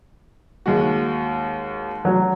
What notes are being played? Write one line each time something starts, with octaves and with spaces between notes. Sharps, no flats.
D#2 G#3 F#4
F#3